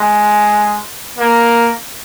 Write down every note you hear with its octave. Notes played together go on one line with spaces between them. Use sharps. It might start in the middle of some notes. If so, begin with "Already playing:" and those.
Already playing: G#3
A#3